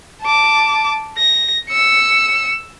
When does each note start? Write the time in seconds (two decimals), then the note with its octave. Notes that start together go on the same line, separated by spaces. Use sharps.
0.22 A5 D6
1.18 A#6
1.69 E6 C#7